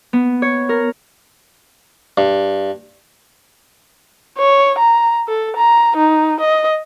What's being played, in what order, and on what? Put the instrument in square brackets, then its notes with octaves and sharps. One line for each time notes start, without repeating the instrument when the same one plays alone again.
[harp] B3
C#5
A#4
[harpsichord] G2
[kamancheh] C#5
A#5
A4
A#5
D#4
D#5